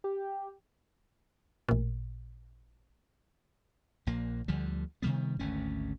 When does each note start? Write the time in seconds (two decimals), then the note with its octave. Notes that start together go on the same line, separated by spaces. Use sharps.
0.04 G4
1.69 A1 A#2
4.07 A#1 A#2 A#3
4.48 D2 D3 F3 G3
5.02 C3 D#3 G3 B3
5.39 G#1 D2 A3 C#4